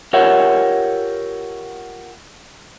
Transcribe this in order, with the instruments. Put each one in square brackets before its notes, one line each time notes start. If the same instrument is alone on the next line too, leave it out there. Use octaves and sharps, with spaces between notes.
[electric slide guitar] F4 G4 A#4 C#5 E5 F#5